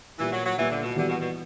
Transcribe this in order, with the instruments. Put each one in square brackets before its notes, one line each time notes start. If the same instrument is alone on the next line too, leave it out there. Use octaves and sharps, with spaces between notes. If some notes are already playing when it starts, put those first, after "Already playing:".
[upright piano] A#2 G3 A#3 [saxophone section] E3
[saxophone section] F#3
F#3
[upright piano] A#2 G3 A#3 [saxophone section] E3
[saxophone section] D3
B2
[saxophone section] D3 [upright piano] E3 G3 B3 F#4
[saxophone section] B2
B2